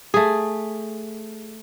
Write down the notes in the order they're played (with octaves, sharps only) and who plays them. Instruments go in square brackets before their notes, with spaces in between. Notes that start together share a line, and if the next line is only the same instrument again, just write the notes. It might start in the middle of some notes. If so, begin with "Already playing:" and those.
[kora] A3 G#4